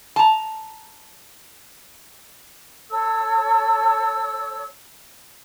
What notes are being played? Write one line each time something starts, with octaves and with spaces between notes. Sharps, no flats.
A5 A#5
A4 C#5 E6